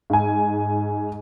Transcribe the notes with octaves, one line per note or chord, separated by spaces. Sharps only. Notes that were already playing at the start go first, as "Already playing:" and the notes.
G#2 G#5